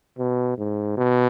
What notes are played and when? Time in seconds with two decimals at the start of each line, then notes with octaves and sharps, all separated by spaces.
0.19 B2
0.57 G#2
0.97 B2